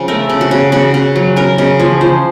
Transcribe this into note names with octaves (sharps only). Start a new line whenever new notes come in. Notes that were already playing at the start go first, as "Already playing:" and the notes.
Already playing: C#3 F3
A3 A#4
C#3
F#4
C#3
C#3 F#4
C#3
F#3
C#3 A#4
C#3 D#5
F3 C#5
F3 C5